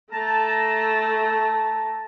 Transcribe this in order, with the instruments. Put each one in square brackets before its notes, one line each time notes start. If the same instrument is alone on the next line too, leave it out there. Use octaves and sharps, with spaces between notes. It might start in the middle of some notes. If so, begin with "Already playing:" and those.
[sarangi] A3 [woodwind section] A5 A#5